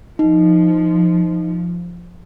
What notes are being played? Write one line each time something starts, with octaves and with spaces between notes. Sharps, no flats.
F3 D#4